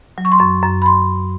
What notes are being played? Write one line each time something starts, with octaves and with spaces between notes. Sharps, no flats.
F#3
C#6
C6
F#2 C#6
F#2
B5
C6